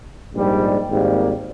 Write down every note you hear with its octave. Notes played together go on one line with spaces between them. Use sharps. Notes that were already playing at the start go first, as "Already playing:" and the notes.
A#1 G#2 G3
G#1 G#2 G3 A#3